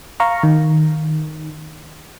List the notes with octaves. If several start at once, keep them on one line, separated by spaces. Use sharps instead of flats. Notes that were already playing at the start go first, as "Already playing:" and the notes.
F5 A#5 C#6
D#3